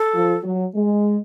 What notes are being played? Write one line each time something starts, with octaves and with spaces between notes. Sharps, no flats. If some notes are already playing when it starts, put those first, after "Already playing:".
Already playing: A4
F3
F#3
G#3